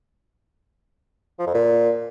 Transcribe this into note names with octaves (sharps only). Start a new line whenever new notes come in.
F3
F2
A#2